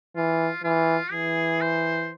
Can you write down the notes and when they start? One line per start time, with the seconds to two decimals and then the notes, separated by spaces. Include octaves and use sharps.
0.16 E3 F4
0.63 E3 F4
1.12 E3 G#4
1.61 C5